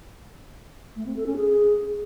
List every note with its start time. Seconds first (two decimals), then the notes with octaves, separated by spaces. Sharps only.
0.96 A3
1.06 C4
1.16 A4
1.26 C#4
1.36 G#4